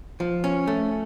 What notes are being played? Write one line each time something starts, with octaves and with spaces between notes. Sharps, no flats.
F3
C#4
A3